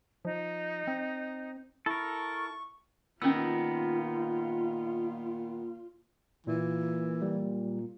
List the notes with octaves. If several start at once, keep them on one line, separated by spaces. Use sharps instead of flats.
F3 D#4
C4
E4 A4 A#4 C#6
A#2 D#3 B3 C#4 F4 E6
A#2 E3
G3